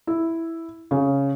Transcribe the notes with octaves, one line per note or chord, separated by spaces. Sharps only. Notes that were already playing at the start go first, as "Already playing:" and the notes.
E4
C#3